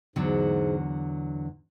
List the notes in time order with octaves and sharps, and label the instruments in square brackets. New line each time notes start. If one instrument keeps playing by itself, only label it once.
[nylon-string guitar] E2 D3 F#3 [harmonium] G#2